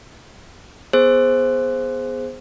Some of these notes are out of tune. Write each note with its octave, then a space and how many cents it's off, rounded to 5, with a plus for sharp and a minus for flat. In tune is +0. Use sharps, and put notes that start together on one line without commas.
B3 +0 G#4 +0 C5 +0